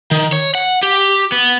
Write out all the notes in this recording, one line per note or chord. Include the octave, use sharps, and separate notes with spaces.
D#3
C#5
F#5
G4
B3